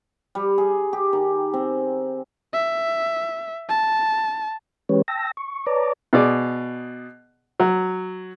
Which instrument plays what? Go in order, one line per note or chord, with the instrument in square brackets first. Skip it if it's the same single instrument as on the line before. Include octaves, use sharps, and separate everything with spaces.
[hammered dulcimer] G3
G#4
G4
D#3
C4
[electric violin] E5
A5
[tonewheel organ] E3 G#3 C#4 G4 B4 C#5
G5 A5 E6 A#6
C#6
B4 C#5 D5 A5 A#5 D6
[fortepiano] B2 G#4 D5
F#3